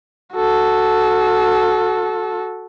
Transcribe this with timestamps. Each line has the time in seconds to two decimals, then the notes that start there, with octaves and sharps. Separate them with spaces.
0.34 F#4 A4